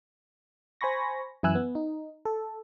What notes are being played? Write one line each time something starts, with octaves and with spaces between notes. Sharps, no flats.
C5 G#5 B5 C#6 A#6
F#2 E3 E4 G#5 E6 F#6
B3
D#4
A4